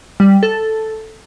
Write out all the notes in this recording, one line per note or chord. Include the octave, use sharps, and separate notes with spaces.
G3
A4